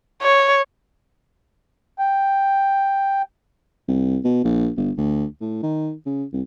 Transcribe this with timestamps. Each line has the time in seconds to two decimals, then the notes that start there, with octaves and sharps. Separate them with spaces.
0.22 C#5
1.99 G5
3.88 C2
4.25 B2
4.44 A#1
4.77 G1
4.97 D2
5.41 A2
5.63 D#3
6.06 C#3
6.33 C2